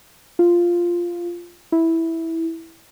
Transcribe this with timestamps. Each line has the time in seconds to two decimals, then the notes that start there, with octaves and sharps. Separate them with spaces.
0.39 F4
1.72 E4